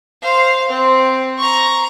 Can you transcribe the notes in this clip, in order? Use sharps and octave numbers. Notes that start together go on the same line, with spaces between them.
C5 F5
C4
A#5 C#6